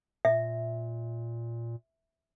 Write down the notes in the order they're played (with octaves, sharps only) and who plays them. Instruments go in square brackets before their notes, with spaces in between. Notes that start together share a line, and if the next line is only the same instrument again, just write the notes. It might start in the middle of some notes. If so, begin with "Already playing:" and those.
[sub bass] A#2 [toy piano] E5